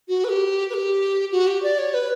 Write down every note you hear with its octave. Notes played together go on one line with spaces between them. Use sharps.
F#4
B4
G4
B4
G4
F#4
G4
D5
C#5
B4